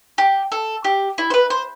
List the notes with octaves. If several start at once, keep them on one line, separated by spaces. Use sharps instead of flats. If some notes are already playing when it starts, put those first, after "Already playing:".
G4
A4
G4
E4
C5
B4
C5